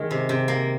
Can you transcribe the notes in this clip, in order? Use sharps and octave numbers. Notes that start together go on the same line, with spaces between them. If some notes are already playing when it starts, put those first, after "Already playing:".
Already playing: D#3 G#3
C3
C3
A#3